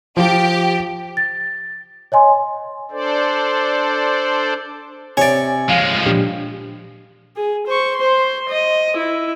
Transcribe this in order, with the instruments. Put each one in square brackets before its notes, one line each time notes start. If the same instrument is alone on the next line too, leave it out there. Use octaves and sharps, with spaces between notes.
[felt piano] F3 [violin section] G4
[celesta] A6
C#5 D#5 G#5 C6
[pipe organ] D4 A4 C5 D5
[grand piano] C3 [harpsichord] C#5 D5 [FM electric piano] G#5
[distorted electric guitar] F3 G#3 [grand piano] F5
[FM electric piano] A#2 D4 G4
[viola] G#4
C5 C#6
C5 C6
D#5
E4